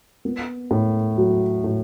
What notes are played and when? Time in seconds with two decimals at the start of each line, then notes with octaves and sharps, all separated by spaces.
0.25 B3
0.71 A2
1.17 F#3
1.64 A2